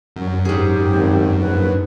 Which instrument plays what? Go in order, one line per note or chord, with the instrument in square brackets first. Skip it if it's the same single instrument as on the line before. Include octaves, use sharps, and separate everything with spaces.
[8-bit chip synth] F#2
[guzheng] G#2 G#4 [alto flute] G4
[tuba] G#1
[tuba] A#1 [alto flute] B4